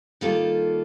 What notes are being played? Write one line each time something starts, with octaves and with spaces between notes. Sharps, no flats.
D#3 G3 A#3 F4 A4